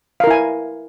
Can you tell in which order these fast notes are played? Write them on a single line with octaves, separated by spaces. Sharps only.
F5 A#4 E4 G#5